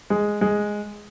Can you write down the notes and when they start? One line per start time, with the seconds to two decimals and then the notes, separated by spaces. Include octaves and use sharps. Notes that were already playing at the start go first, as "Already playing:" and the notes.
0.10 G#3
0.41 G#3